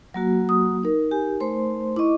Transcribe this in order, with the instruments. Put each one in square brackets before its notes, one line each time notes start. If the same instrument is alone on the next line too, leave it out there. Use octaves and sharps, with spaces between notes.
[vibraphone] F#3 A#3 F#4
[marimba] D#6
D#4 A#4
[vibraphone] G4 [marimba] G#5
[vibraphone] A3 C5 C6
[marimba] E4 C#6 [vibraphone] D#5 D6